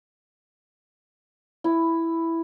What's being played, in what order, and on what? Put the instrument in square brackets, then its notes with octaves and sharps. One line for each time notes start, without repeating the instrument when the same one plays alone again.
[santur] E4